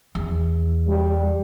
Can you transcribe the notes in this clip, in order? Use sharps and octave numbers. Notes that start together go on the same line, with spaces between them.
E2
G3